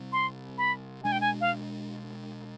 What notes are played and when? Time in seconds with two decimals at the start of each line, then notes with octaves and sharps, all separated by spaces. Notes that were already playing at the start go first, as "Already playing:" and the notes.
Already playing: C3 G3 C4
0.13 C6
0.58 B5
1.04 B2 G#3 D4 G#5
1.12 G5
1.21 G#5
1.41 F5